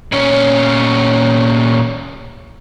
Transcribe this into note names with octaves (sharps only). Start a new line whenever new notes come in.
A#2 C#4